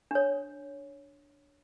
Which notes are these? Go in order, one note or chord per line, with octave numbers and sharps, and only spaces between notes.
D4 C#5